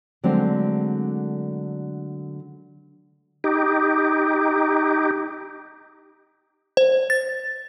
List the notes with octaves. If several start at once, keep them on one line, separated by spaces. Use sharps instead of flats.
D3 F#3 G#3 A3 C4
D#4 G4
C5
A6